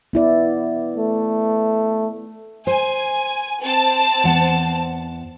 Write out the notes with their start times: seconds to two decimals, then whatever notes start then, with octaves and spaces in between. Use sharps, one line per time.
0.13 B3 E4 D5
0.97 A3
2.67 C5 G#5
3.62 C4 A5
4.24 E2 F#5